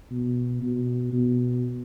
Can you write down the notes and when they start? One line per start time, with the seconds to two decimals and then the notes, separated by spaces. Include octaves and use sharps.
0.11 B2
0.62 B2
1.13 B2